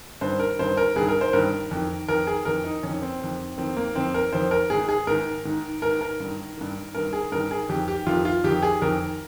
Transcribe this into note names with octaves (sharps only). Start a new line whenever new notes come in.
G2 D#3 C5
A#4
G2 D#3 C5
A#4
G2 D#3 G#4
A#4
C5
G2 D#3 A#4
F2 D#3
F2 D#3 A#4
G#4
F2 D#3 A#4
D#4
F2 D#3 C#4
C4
F2 D#3
F2 D#3 C4
A#3
F2 D#3 C4
A#4
F2 D#3 C5
A#4
G#2 D#3 G#4
G#4
G#2 D#3 A#4
G#2 D#3
G#2 D#3 A#4
A#4
G2 D#3
G2 D#3
G2 D#3 A#4
G#4
G2 D#3 A#4
G#4
F2 D#3 G4
G4
F2 D#3 F4
F4
F2 D#3 G4
G#4
F2 D#3 A#4